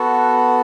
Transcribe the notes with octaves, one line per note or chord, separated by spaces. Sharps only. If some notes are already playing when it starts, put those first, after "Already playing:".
Already playing: B3 F#4 A4